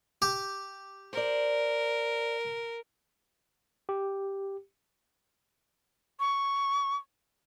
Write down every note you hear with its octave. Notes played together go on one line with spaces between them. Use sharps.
G4
A#4 C5 D5
G4
C#6